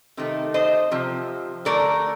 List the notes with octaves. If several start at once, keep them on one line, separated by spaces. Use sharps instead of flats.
C3 D#3 A3
C5 D#5
C3 F3
D3 A3 A#4 D5